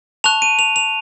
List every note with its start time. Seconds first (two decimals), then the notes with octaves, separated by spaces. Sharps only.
0.24 A5 C#6 F#6 F7
0.42 D#7
0.59 F7
0.76 F7